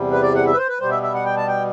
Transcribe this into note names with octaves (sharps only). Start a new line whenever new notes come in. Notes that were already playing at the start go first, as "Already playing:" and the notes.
Already playing: E2 C3 G3
B4
D5
F#5
E5
B4
C5
B4
B2 G3 C5
E5
E5
F#5
G5
A5
G5